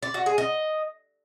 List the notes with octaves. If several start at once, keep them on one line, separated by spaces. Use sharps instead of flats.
D5
F#4
G#4
D#5